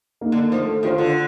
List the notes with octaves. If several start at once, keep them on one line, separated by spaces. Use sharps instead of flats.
A#3 D#4
D3
F3 A3
D#3 D4 F4 A4 C5
D3